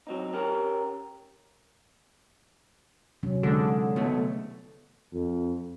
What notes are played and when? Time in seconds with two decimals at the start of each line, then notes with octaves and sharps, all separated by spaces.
0.07 F#3 C4 D#4
0.33 C#4 G4 A#4
3.23 C3 F#3 C#4
3.43 G#2 D3 D4 G#4
3.96 B2 F#3 A3
5.13 F2